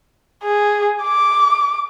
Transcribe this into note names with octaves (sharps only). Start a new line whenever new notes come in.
G#4
D6